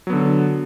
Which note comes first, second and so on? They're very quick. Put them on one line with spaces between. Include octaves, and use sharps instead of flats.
F#3 B3 D3